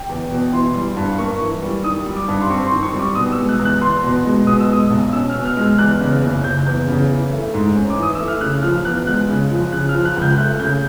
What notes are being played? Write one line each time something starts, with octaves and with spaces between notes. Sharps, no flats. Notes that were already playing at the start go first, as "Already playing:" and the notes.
Already playing: G5
E2
B2
E3 C6
G3
G2
A#3 C#6
E3
G3
D#3 D#6
G3
D6
G2
C6
C4 C#6
D#3 C6
C#6
G3
D6
B2 D#6
E6
G#3
F#6
E2
F#6
E2 C6
B2
G#3
B2 D#6
E6
G#3 D#6
B1
C#4 E6
F6
B2
F6
G#3 F6
E2 F#6
C#3
F#1
F#1 G6
E2
C#3
E3
A3
G#2
C#4
D6
E3
D#6
A3 E6
F6
C#3 F#6
F3 F6
E2 F#6
G#3 F#6
C#3
F3
C#3 F#6
F6
F3
F#6
C#2
G6
A3 F#6
C#3 G6